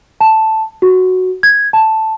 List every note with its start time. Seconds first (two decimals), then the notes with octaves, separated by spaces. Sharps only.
0.21 A5
0.82 F#4
1.43 G#6
1.73 A5